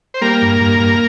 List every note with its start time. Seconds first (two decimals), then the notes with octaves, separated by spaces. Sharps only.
0.14 C5
0.21 G3 A#3 A#4
0.42 G2
0.61 G2
0.80 G2